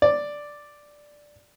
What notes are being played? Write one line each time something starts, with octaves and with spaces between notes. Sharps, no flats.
D5